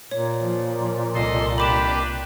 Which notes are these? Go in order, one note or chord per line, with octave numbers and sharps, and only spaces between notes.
A#2 C#5
F3
C2 A4 D#5 C6
D4 G4 B4 B5 D6 E7